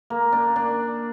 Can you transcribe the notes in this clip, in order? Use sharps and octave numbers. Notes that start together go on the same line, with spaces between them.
A#3
D4
D4